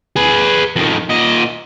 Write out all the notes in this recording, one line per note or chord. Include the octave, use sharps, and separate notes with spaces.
G#4 B4
F2 D#3
A#2 D#5